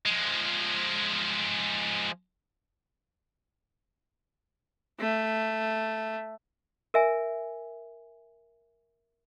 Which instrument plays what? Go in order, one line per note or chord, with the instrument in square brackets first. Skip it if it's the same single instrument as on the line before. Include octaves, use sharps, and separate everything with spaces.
[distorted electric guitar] F3 G#3
[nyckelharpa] A3
[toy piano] A#4 E5 G#5